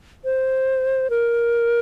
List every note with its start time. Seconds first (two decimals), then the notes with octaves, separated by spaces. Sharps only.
0.25 C5
1.10 A#4